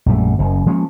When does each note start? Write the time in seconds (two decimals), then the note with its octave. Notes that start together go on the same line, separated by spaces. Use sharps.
0.06 A#1 F#2 G3 A3
0.38 F#1 F#2
0.66 F3 G#3 A#3 C#4